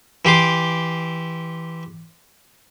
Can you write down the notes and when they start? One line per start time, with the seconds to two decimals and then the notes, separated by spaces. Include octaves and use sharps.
0.25 E3 G4 C6 D6